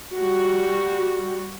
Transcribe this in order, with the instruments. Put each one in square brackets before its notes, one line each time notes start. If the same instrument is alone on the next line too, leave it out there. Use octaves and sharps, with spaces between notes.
[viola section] G3 F#4